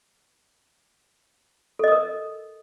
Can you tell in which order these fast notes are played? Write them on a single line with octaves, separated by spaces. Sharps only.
A4 D#5 D#6 A#4